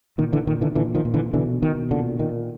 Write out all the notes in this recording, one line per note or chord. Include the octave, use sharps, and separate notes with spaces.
A#2 D#3
D3 E3
A#2 D#3
D3 E3
A#2 D3 E3
D#3 F3
A#2
D3 E3
B2 D3 E3
B2 D#3
A#2 D3
A#2 D#3